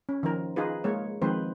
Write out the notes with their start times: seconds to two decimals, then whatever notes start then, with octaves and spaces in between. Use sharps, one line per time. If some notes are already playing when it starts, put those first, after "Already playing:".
0.09 C#4
0.23 D#3 F3 A#4
0.56 D#4 F4 G#4 B4
0.84 G#3 A#3 C#5
1.22 D#3 F3 G#3 C4 B4 C5